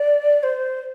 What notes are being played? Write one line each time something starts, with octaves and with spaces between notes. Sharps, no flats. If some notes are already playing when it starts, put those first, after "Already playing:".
Already playing: D5
C5